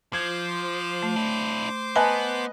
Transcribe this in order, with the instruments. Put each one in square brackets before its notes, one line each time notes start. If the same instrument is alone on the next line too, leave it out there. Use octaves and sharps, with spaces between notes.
[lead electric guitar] F3 [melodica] C5 C6 D6 [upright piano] G#6
[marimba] A3
[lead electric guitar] D4 E4
[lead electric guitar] B3 [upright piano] B4 D#5 F#6 [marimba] G#5 A5